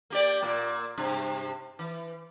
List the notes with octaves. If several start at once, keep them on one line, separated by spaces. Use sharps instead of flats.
A#3 G4 D5
A#2 A#3
G2 C3
E3